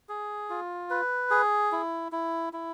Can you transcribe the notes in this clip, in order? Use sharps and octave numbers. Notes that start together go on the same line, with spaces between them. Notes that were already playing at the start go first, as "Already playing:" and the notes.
G#4
F4
B4
G#4
E4
E4
E4